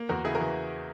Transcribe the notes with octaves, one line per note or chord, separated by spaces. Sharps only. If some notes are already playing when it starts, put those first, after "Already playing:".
Already playing: A#3
E2 F#4 A#4
C#3 E4 G#4
F#4 A#4
E3